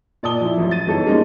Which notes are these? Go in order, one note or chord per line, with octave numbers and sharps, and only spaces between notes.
A#2 D5 A5 D#6 G7
F3 E4
A1 F3 F#3
A6 D#7
G1 E3 D#4 A4 C#5
G3 G#3 A#3 C#4 D#4 F4